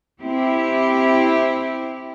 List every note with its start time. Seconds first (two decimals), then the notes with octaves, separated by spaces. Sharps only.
0.21 C4 E4 G4